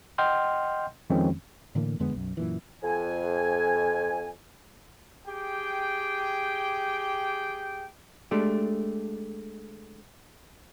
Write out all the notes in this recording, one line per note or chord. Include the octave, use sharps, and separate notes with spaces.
D#5 F#5 G5 C6 F6 G6
F2 D#3 F3 G#3 C4 C#4
A2 D3 E3 A#3
F2 D3 G#3 B3
B1 F#2
F#2 A#2 E3
F2 G#5
G4 G#4 G5
G#3 A3 D4 G4